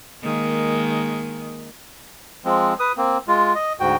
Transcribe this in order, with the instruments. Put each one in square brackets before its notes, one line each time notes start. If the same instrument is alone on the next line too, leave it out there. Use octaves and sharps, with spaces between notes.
[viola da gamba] D#3 G#3 A#3
[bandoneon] F3 G#3 C4
B4 D#6
A#3 C4
G#3 F4
D#5
D2 G#2 F#4 G5